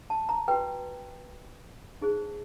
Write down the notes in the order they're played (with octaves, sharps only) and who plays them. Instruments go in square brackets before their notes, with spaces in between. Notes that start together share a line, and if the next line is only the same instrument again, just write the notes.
[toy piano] A5
A#5
F#4 B4 G5
D#4 G#4 C5